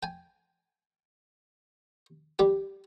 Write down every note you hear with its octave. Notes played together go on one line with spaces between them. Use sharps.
G5 G#5
G3 G4 G5